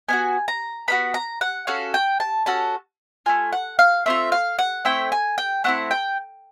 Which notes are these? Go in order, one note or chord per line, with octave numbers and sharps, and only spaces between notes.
B3 D4 F#4 G#5
A#5
B3 D4 F#4 B5
A#5
F#5
C#4 F#4 A4 F5
G5
A5
C#4 F#4 A4 A5
A3 C4 F4 G#5
F#5
F5
A3 C4 F4 E5
F5
F#5
A3 C4 E4 G5
G#5
G5
A3 C4 E4 F#5
G5